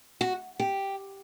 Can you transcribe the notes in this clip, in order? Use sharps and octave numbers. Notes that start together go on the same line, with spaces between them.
F#4
G4